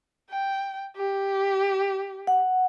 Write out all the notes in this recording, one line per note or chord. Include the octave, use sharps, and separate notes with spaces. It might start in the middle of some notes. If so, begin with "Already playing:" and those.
G5
G4
F#5